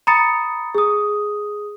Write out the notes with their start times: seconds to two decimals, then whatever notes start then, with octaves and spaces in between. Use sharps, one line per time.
0.07 A#5 B5 D#6 A6 C#7
0.75 G#4 D#6